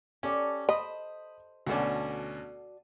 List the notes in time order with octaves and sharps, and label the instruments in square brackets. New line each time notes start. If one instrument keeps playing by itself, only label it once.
[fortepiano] C#4 [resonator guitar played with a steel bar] G4 A4 D5
[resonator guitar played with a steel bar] C5 [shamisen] D#5 [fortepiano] B5 D#6
[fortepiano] D2 B2 C#4 [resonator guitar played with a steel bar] F#4 A4 D5